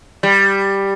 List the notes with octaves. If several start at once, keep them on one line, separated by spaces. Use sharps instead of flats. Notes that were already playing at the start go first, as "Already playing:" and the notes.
G3